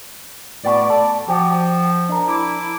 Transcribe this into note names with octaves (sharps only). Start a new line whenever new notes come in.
A2 B3 F#4 D5
A4
F3 F#4 G4
D4 A#4
E4 D6